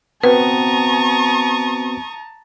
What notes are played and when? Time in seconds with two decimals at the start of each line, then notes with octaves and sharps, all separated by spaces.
0.23 B3 C4 F#4 B4 A5 A#5 C#6 D#6